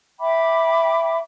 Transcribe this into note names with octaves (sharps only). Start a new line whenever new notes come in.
E5 G5 B5 D6